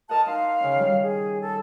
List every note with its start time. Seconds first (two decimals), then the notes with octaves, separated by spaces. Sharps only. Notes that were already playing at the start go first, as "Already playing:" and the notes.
0.09 A#4 D#5 F#5 A5
0.26 D#4 F5 C6
0.60 C#3 C#4
0.75 D#3 G3
1.03 G#4
1.41 A4